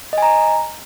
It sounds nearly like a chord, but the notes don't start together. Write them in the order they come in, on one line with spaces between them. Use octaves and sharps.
D#5 G#5 A#5